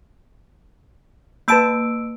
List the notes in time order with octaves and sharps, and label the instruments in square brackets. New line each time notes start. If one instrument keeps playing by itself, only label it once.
[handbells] A#3 E6 D7 [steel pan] B4 A5 B5